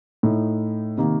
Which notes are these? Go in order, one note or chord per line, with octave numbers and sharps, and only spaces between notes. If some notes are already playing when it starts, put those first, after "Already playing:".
A2 A3 D#4
C3 D#3 A#3